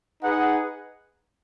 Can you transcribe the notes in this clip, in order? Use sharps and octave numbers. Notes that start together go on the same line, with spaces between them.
D#4 G#4 B4 F#5